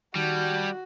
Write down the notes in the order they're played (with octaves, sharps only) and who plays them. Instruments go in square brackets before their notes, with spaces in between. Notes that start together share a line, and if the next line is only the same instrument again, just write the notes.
[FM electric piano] D#3 [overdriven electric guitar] G3 [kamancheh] F#4 [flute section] A5 G6 G#6